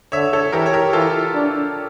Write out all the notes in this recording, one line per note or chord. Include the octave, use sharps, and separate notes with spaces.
D3 C#5 E5
A4 C#5
E3 G4 A#4
C#5
G4 A#4
E3 F4 A4
D4